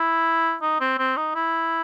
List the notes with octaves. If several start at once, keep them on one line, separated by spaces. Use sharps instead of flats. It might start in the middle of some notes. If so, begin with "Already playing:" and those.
Already playing: E4
D#4
C4
C4
D#4
E4